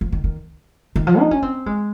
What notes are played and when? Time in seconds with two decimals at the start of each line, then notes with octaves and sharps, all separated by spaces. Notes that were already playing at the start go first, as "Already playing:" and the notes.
0.01 F3
0.12 D#3
0.24 D#3
0.96 D#3
1.07 F3
1.19 D#4
1.31 C#4
1.42 C4
1.66 G#3